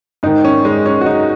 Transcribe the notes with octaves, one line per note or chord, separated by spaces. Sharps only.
G#2 D#3 D#4
C#4
G#3
C#4
F#4
D#4